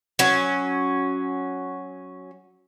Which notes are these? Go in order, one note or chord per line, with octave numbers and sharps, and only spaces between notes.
F#3 C#4